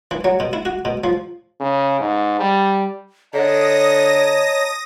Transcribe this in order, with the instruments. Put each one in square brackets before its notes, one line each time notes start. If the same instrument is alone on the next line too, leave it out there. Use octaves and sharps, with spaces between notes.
[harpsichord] E3
F#3
B2
E4
F#4
B2
F3
[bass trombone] C#3
G#2
G3
[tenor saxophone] D3 [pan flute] C#5 [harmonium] D#5 A5 A#5 [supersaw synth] D#6 A#6